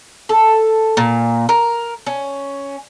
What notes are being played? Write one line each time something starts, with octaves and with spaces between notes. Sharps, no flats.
A4
A#2
A#4
C#4